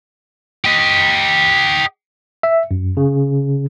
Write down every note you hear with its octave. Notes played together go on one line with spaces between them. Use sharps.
G4 D#5
E5
F#2
C#3